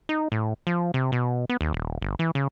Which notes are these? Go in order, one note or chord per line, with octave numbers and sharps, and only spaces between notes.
D#4
A2
F3
C3
B2
B3
D#2
D#1
G1
E3
C#3